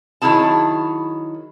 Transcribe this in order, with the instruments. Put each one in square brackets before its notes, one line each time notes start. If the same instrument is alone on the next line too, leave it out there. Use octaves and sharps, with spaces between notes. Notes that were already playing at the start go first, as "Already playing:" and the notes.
[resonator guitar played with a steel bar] D#3 F#3 E4 G#4 A5